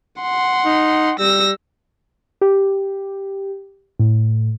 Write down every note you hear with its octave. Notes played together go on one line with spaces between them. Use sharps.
F#5 C6
D#4
G3 E6 A#6
G4
A2